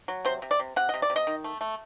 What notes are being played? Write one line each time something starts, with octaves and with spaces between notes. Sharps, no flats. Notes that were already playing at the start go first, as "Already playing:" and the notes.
F#3
C3 C5
C3
D5
C3
C3 F#5
C3 D#5
D5
C3
D#5
D#3
A3
A3